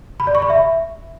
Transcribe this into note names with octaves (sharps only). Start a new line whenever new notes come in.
B5
D5
C#6
B5
E5